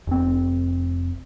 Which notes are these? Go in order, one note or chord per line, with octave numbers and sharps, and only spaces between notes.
F1 C4